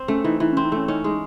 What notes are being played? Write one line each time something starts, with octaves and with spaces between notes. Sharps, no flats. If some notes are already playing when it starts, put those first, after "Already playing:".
Already playing: C4
A3 C#4
E3 D#4
E3 D#4
C#4
C4
D#4
A3 C#4
C#4 D#4
G#3 D#4